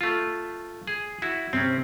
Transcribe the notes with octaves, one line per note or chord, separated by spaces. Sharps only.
A3 F4
G#4
E4 F#4
C3 C4 C#4